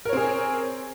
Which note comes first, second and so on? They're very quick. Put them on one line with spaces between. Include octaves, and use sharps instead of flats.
A#4 C#5 C4 G#4